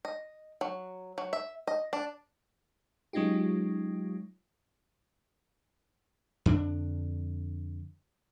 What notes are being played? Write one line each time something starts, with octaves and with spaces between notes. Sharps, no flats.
D#5
F#3
F#3
E5
D#5
D4
F#3 G#3 C#4 D#4 F4 G4
F2 D3 D4